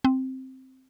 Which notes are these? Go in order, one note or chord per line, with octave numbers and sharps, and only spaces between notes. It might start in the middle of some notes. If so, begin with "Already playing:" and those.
C4